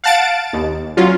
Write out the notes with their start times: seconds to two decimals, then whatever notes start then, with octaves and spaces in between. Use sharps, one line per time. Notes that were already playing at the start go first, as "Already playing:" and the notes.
0.04 F5 F#5 A5 A6 D7
0.53 D#2
0.97 F#3 C#4 F4